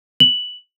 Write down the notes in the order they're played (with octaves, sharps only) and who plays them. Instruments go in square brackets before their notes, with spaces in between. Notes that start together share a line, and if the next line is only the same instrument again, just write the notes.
[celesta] F#7